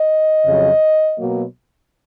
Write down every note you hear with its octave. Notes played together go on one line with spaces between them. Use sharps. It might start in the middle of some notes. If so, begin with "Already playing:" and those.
Already playing: D#5
F2 C#3 F#3
B2 F#3 A#3